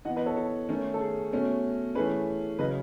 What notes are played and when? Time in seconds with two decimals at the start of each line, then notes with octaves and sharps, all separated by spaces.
0.05 E3 B3 D#5 F#5
0.16 B4 D#5
0.26 A4 C#5
0.37 A4
0.69 D#3 A3 C#4
0.94 A4
1.00 G#4
1.33 B2 A3 C#4
1.95 E3 A3 C#4 G#4 B4
2.59 C#3 F#3 C#4 B4 D#5